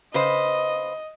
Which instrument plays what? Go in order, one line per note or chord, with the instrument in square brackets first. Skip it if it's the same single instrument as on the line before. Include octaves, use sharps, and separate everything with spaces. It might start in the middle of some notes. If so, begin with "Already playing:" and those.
[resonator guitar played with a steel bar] C#3 B4 C5 [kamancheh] D#5